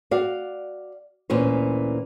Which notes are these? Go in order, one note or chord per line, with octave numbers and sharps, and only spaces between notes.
F#4 D5 F5
D2 A#2 E3 C#4 C5